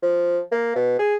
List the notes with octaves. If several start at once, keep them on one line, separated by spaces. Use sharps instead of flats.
F3
A#3
B2
G#4